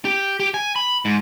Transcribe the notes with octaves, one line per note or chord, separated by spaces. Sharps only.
G4
G4
G#5
B5
G#2